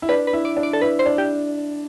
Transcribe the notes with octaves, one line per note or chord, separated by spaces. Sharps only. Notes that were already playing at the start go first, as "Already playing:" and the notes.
E4
D4 B4
B4
E4
D5
D4
D5
A4
E4 B4
C5
D4
G4